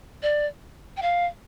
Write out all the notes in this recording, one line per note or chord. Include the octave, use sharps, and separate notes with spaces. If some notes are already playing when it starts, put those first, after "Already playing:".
D5
G5
F5